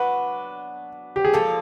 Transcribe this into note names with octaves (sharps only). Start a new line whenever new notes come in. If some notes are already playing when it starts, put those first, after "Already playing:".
Already playing: F#3 B3 D4 F#4 B4
G4
G#4
F3 A#3 D4 F4 A4